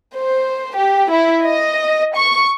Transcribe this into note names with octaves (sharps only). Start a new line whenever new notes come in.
C5
G4
E4
D#5
C#6